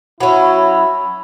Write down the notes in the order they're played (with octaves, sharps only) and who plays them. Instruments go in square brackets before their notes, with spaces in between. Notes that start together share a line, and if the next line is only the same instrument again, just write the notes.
[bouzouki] F#3 C#4 [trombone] E4 [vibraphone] B5